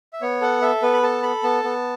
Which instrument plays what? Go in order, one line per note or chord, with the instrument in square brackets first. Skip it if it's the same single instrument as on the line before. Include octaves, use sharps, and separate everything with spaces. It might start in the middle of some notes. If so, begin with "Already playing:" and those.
[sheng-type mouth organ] E5
B3 C#5
A4 F#5
A4 E5
B3 B4
B5
A4 A5
A4 B5
B3 A5
B3